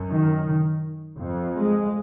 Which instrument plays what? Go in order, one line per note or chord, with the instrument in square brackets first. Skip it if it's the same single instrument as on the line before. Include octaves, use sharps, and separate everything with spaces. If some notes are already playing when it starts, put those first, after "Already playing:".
Already playing: [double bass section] F#2
D#3
F2
G#3